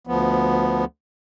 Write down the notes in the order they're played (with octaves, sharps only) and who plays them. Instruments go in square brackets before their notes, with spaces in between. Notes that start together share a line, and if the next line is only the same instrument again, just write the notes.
[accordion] D2 F3 B3